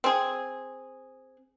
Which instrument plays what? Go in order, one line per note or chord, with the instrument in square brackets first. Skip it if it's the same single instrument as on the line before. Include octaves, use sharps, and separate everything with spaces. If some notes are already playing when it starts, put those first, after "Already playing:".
[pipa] C4 G#4